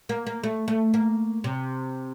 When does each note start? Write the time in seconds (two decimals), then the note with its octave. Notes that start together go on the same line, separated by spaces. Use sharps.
0.09 A#3
0.27 A#3
0.44 A3
0.68 A3
0.94 A#3
1.44 C3